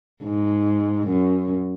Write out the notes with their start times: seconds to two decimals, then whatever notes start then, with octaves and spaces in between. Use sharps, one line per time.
0.23 G#2
1.07 F#2